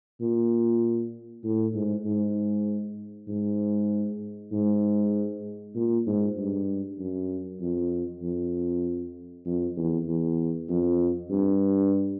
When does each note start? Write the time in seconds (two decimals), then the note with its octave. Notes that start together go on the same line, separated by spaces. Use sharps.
0.20 A#2
1.44 A2
1.74 G#2
2.05 G#2
3.28 G#2
4.52 G#2
5.75 A#2
6.07 G#2
6.37 G2
6.98 F#2
7.60 F2
8.22 F2
9.45 F2
9.76 E2
10.07 E2
10.69 F2
11.30 G2